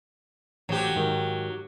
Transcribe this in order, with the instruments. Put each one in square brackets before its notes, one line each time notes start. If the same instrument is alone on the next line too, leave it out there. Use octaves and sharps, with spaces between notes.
[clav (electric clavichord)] A1 C5 [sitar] F#3 G4
[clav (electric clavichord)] G#2 D#3 A#4